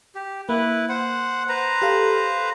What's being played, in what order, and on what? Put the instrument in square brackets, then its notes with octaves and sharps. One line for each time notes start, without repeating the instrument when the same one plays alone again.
[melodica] G4
[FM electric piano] A#3 [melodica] E4 B4
[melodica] C5 F#5
B4 C5 A#5
[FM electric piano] G4 A4 F5